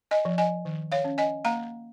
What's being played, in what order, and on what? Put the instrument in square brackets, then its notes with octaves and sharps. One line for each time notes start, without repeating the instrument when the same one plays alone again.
[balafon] D#5 G#5
F3
D#5 G#5
D#3
C#5 F5
C#4
D#5 G#5
A#3 F5 A#5